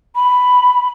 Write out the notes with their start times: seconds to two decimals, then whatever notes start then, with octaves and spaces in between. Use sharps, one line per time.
0.15 B5